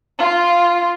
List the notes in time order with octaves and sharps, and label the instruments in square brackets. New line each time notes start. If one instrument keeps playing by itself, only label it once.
[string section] F4